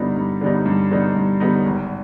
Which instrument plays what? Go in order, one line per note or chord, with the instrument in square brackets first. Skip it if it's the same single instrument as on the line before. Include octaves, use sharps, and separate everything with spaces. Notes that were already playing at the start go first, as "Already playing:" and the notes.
Already playing: [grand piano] G2 D3 G3 B3 D#4
G2
D3 G3 B3 D#4
G2
D3 G3 B3 D#4
G2
D3 G3 B3 D#4
G#1